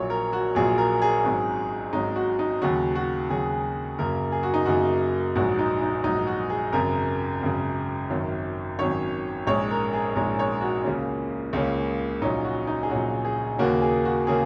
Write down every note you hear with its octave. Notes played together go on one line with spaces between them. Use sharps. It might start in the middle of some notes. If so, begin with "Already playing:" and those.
Already playing: A#1 A#2 F#3 C#5
A#4
F#4
A#1 A#2 F#3 G#4
A#4
G#4
G#1 G#2 F#3 C#4
G#1 G#2 F#3 C#4 D#4
F#4
D#4
D#2 C#3 F#3 F#4
F#4
D#2 C#3 F#3 G#4
F#2 C#3 A#3 A#4
G#4
F#4
D#4
F#2 C#3 A#3 F#4
A#1 G#2 F#3 F#4
D#4
D#4
A#1 G#2 F#3 D#4
F#4
G#4
G#1 F#2 C#3 A#4
G#1 F#2 C#3
G#1 F#2 D#3 F#3 C#4
G#1 F#2 D#3 F#3 C#4 C#5
A#1 G#2 G#3 C#4 C#5
A#4
G#4
A#1 G#2 G#3 C#4 A#4
C#5
F#4
C#2 C#3 A#3 C#4
C#2 C#3 A#3 C#4
A#1 A#2 F#3 C#4 D#4
F#4
D#4
G#4
A#1 A#2 F#3 C#4 F#4
G#4
D#2 C#3 A#3 C#4 F#4
G#4
F#4
C#3 A#3 C#4 G#4